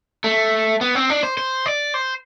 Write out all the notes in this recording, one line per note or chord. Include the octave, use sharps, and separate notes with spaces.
A3
B3
C4
D4
C5
C5
D5
C5